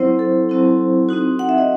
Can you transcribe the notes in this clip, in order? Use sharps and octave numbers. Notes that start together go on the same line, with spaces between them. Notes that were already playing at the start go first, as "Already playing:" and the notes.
Already playing: F#3 C4 E4 C5
A4
F#3 C4 E4
C4 D#4 F#4
F#5
E5
D#5